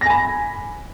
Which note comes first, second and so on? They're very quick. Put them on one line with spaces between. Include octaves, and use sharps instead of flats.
A#6 G#5 B5